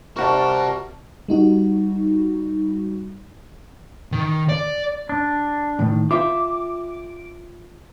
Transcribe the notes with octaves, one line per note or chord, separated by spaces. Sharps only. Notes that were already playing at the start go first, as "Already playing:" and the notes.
C3 G3 F#4 A#4 D5 F#5 A5 C#6
G3 D#4 F#4
D#3
D5
D4
A2 D#3
F4 E5 G5 D6